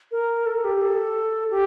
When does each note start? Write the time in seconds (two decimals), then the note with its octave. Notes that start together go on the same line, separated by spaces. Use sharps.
0.12 A#4
0.46 A4
0.64 G4
0.81 A4
1.51 G4